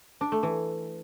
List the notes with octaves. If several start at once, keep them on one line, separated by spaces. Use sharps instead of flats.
D4
A3
E3